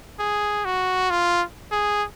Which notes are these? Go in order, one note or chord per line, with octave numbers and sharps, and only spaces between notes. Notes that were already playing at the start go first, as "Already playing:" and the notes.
G#4
F#4
F4
G#4